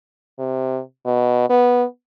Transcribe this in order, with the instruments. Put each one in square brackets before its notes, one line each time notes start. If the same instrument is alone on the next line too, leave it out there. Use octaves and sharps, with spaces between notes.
[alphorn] C3
B2
B3